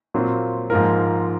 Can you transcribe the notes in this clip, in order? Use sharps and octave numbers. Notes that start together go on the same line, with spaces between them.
A#2 F#3 C4 F4
G#2 F3 A#3 F4 A#4